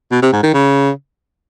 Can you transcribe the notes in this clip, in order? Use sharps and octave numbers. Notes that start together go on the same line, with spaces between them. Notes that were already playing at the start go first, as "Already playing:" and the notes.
B2
C3
G#2
D#3
C#3